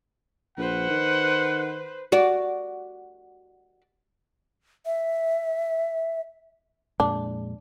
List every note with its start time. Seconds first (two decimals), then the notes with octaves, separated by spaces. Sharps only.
0.58 A#1 B4 C5 F#5
0.90 D#3
2.12 F#4 D5
4.86 E5
7.00 F2 A#2 G#3 D4